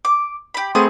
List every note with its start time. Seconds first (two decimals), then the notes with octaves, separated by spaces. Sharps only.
0.05 D6
0.54 G4 B5
0.75 A3 B3 C4 G#4 C6 D#6